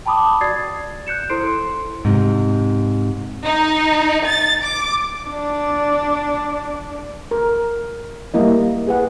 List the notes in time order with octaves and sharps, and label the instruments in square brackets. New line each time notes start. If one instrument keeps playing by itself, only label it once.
[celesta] G5 A5 B5 D6 D#6
F#4 D5 D#6 G#6 A6 C7
F#6 G6 C#7 E7
E4 A4 C5 C6 C7 D7
[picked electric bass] G#2 C3
[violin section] D#4
A6
D6
[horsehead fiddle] D4 D5
[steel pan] A#4
G3 A#3 E4 D#5
G#4 B4 F#5